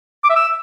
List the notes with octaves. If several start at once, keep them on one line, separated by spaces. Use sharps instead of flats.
D6
E5
E6